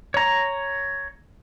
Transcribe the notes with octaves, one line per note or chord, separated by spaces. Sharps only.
C#5 A#5